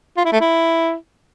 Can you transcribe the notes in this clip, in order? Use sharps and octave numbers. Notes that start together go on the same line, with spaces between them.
F4
E4
A3
E4